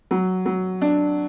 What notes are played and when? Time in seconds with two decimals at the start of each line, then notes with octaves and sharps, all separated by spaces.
0.11 F#3
0.46 F#3
0.81 D4